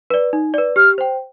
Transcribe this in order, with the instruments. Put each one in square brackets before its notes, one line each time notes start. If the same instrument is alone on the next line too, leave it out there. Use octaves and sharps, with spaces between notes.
[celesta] B4 D5
D#4
B4 D5
[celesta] G4 [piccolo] F6
[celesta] C5 G5